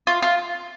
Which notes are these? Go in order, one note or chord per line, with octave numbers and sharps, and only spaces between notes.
F4
F4